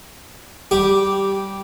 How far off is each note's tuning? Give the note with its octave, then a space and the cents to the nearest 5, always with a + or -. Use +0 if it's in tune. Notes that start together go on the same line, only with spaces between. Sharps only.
G3 -10 G4 +0